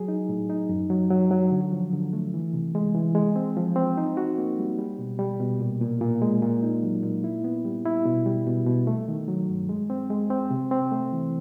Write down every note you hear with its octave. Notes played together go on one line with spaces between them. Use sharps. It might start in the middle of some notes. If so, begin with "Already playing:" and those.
Already playing: F#3 G#4
D#4
A2
D#4
F#2
F#3
F#3
F#3
D3
F3
D3
A3
E3
C3
G#3
E3
G#3
C4
F3
C4
D#4
F#4
A#3
G3
G3
B2
G3
B2
A#2
A#2
A#2
G#3
A#2
D#4
F#3
A#2
E4
B3
G3
E4
B2
G3
B2
B2
A3
D#3
F#3
G2
G#3
C4
G#3
C4
C3
C4
A3
E3